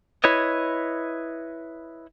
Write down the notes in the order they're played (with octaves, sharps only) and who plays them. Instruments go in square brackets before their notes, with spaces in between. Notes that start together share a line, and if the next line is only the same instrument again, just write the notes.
[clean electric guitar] E4 B4 C#5 D#5